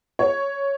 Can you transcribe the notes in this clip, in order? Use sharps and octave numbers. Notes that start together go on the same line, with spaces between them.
C#5